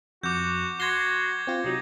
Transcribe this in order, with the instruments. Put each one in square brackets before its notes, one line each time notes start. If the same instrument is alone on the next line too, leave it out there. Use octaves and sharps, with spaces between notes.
[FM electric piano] F2 [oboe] F#4 [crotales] D6 G6
[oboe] F#4 [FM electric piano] C6 A#6 C7 [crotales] G#6 G7
[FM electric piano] C4 F4
[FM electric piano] C3 F#3 [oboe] D#4